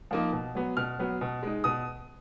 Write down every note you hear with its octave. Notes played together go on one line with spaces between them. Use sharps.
F3 A#3 D#4
B2
F#3 B3
B2 F6
F#3 B3
B2
G#3 D#4
B2 D#6